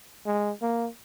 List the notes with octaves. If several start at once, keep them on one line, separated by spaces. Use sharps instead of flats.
G#3
A#3